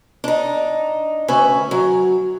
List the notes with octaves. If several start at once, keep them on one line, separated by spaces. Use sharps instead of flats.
D4 D#4
D2 C#4 B4 E5
F#3